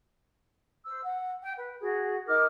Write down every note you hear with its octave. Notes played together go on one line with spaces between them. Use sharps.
C5 E6
F#5
G5
B4
F#4 G#4
D#4 A#4 D6 F6